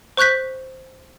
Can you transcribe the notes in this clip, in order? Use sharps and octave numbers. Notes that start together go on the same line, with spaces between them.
C5 C#6 F#6 G6 B6